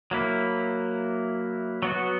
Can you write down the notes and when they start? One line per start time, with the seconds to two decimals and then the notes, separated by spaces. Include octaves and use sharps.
0.11 F#3 A#3 E4
1.83 F#3 B3 F#4